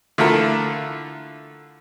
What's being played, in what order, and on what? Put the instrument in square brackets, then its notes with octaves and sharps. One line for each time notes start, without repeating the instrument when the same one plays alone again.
[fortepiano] D3 A3 E4 F4 A4 A#4